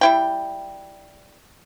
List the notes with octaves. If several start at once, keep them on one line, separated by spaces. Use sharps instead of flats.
G3 E4 G5